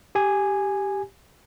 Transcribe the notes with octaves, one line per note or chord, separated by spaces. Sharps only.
G4 G#5